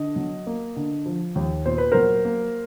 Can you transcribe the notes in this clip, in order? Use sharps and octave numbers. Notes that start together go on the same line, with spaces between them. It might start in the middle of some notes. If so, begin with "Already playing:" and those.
Already playing: D3 D#5
F#3
A#3
D3
F3
D#2
A#2 C5
B4
F#3 A#4 C5
A#3